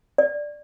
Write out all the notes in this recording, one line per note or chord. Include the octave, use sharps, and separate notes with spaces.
D5